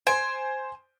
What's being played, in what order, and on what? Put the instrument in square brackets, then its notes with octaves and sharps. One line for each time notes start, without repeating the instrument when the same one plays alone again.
[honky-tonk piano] C5 D7 [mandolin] G#5